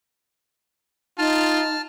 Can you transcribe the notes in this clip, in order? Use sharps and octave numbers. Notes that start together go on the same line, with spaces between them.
D#4 F4 A5 F6